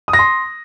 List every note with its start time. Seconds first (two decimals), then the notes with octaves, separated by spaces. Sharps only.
0.08 D#6
0.13 A#6
0.19 C6